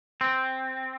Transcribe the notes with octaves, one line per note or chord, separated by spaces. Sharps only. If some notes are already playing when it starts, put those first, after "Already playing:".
C4